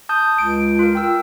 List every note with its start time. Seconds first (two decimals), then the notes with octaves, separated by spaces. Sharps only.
0.09 A5 D#6 G6
0.38 C#2 D7
0.79 F4 A#4
0.95 G5 E6